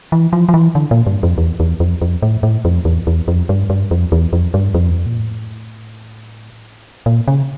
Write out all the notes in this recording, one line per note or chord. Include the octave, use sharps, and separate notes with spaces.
E3
F3
F3
E3
D3
A#2
G2
F2
E2
E2
F2
F2
A2
A2
F2
E2
E2
F2
G2
G2
F2
E2
F2
G2
F2
E2
F2
A#2
A2
A#2
C#3